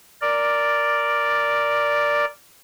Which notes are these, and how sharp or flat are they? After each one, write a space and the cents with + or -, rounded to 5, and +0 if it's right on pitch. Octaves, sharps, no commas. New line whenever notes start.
A#4 +0 D5 +0